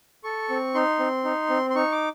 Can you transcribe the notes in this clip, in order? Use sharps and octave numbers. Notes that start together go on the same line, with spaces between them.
A4 C#6
C4
D#4 C6
C4
D#4
C4
C6
D#4 C#6
D6